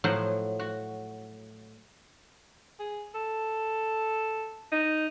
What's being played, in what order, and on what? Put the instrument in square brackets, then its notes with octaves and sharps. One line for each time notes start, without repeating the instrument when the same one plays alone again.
[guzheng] A2 F3 F#3 C5 F#5
F#4
[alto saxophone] G#4
A4
D#4